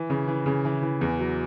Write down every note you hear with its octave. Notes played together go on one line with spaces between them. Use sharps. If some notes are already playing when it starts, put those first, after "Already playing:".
Already playing: E3
C#3
E3
C#3
E3
E3
E2
F#3